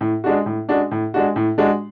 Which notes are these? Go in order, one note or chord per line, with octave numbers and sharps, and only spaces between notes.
A2
G#3 D4 F#4
A2
G#3 D4 F#4
A2
G#3 D4 F#4
A2
G#3 D4 F#4